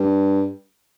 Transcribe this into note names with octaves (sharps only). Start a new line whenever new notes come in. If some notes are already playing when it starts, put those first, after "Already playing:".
Already playing: G2